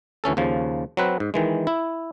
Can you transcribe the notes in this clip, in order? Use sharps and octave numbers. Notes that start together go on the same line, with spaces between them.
D2 E3 C#4 A4
D#2 C#3 F3
F#3 C4 B4
G#2
D#3 E3 G#3
E4